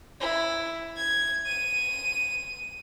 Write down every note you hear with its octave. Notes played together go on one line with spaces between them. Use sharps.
E4
G#6
D#7